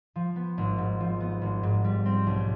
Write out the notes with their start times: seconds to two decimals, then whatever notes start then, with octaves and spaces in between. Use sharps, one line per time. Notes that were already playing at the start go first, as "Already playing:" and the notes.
0.16 F3
0.36 B3
0.58 G#1
0.78 G#2
1.00 F3
1.21 B3
1.42 G#1
1.63 G#2
1.84 G3
2.06 C4
2.27 B1